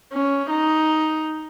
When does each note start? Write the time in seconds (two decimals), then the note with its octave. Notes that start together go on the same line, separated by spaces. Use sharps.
0.13 C#4
0.50 D#4